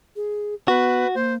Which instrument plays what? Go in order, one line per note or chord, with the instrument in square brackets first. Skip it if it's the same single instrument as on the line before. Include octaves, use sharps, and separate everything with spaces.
[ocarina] G#4
[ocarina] B3 [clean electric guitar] F#4 [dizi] B4
[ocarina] A#3 [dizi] C5